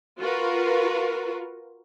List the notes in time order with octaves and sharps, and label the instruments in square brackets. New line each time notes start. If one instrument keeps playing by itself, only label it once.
[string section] F4 F#4 A#4 B4